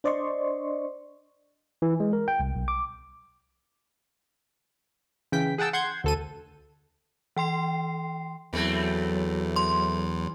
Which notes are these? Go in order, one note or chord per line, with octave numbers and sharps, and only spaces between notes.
D4 C5 D5 D#5 C6 C#6
E3
G#3
A#4
G5
C2
B1
D6
C#3 E3 G5 B6
G#4 F#5 G5 A5 E6
F#5 C6 G6 G#6
D2 A4 D#7
E3 G5 C6 C7
E2 E3 F#3 A3 C4
C6